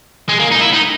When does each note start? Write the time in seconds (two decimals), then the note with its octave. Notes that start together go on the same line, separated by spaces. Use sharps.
0.29 G#3
0.39 A#3
0.51 D#4
0.61 E4
0.74 D#4